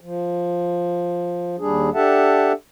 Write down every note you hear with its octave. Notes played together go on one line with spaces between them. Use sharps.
F3
D#2 G3 D4 G#4
D4 G4 A4 E5 F#5 A5